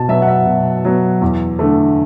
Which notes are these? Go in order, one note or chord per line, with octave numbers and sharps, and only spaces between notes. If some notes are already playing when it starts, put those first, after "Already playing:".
Already playing: B2 A5
F#3 B3 E5
F#5
E5
B2
F#3 B3
E2
D3 A3